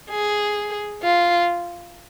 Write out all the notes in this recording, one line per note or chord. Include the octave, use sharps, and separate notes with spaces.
G#4
F4